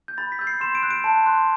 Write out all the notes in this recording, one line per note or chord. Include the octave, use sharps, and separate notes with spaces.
G6
B5 A6
B6
E6 G6
C7
C6 E7
D7
F#6
D7
A5
C6 F#6